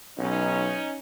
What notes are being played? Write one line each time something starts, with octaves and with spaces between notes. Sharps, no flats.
B1 C#4 D#4